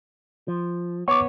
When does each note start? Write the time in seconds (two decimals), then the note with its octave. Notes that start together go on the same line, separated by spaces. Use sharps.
0.48 F3
1.08 B3 C#5 C#6 D6